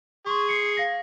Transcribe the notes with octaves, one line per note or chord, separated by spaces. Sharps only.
G#4 C6 C#6
C7 C#7
F5 A#6